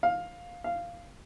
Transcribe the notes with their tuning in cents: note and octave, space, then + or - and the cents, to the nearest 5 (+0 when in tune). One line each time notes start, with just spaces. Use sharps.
F5 +15
F5 -10